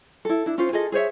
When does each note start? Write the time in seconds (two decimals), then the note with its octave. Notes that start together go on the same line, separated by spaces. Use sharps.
0.25 E4 A4
0.46 D4 E4
0.58 C#4 F4 C5
0.72 F4 G#4 A4 D#5
0.92 G#4 C5 C#5 E5